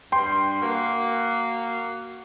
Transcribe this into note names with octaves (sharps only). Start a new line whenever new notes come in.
G2 G5 C6
A#3 F#4